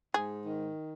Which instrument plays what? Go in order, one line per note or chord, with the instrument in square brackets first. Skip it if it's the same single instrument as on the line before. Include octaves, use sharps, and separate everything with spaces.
[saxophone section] G#2 [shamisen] G#4
[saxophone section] D#3